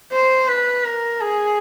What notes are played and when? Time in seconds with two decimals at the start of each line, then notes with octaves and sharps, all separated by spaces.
0.11 C5
0.48 B4
0.84 A#4
1.21 G#4